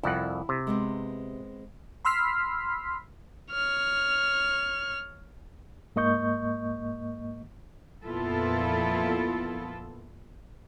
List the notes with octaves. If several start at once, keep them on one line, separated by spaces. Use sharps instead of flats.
C2 F2 E4 F#5
C3
G#3 B3 C4
B5 C6 E6 F6 B6 C7
C#5 F6
G#2 A#3 D#5 C#6 G6
F2 A#2 B3 E4 F4 A4